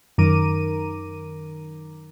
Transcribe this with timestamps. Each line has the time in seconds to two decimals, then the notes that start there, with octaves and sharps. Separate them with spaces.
0.18 F#2 D#3 A#4 A#5 D6 D#7